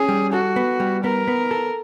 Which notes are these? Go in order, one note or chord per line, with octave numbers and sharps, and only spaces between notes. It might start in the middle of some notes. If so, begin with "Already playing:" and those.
Already playing: C#4 G#4
G3
F#4 A4
B3
G3
B3 A#4
B3
A4